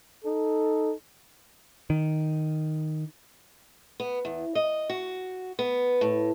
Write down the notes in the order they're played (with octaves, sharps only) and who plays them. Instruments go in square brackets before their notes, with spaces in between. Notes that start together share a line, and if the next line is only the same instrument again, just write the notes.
[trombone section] D#4 A4
[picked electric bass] D#3
[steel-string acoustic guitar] B3
E2
D#5
F#4
B3
A2